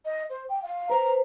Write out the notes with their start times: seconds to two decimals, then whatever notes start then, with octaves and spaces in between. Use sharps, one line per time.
0.05 D#5
0.30 C5
0.49 G5
0.62 F5
0.90 B4 C5 A#5